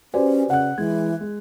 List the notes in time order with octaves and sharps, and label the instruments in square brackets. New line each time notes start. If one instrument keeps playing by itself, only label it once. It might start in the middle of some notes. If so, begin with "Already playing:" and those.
[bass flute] C#4 [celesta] F#4 B4 D5 [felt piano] G4 C5 G#5
[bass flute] C#3 [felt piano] F#5 F#6
[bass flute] E3 [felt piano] G#3 [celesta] G#6
[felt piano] G#3